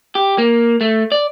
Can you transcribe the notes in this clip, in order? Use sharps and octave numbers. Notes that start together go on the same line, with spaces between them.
G4
A#3
A3
D5